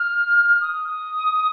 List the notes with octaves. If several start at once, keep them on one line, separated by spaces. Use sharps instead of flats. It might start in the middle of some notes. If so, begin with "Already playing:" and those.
Already playing: F6
D#6